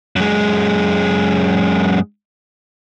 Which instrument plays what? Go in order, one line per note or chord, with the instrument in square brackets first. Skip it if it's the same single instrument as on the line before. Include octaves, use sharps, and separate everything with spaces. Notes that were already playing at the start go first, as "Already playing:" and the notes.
[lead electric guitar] F#2 G#3